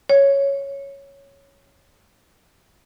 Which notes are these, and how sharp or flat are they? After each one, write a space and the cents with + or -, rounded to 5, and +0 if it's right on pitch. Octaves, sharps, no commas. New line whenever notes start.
C#5 +0